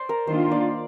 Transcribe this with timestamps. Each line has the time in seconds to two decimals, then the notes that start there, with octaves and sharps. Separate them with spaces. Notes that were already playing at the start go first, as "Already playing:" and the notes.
Already playing: C5 D5
0.09 A#4
0.27 D#3 A#3 D4 F4 C5
0.51 D5